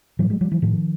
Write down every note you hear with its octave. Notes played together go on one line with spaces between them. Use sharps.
A2 E3 F#3
F#3 G#3
F3 G3
E3 F#3
A2 D#3 F3